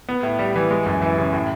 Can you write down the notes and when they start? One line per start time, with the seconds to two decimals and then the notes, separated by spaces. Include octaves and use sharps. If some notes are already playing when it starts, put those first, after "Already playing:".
0.09 B3
0.23 A2
0.39 G3
0.56 E3
0.71 G#3
0.86 F#2
1.02 E3
1.18 C#3
1.33 A2